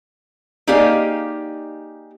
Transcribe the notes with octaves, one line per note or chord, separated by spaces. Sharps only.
A#3 D#4 G4 G#4 D5 F5